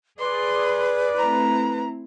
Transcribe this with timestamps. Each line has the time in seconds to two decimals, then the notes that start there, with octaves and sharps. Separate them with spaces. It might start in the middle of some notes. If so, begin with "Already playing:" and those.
0.19 G#4 B4 D5 C6
1.18 A3 C4 E4 A#5